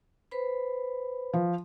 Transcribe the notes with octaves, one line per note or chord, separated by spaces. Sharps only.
B4 C5 B5
F3